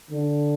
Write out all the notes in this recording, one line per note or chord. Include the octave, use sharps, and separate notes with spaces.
D3